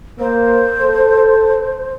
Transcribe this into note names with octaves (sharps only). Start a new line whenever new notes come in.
A#3 C5
A4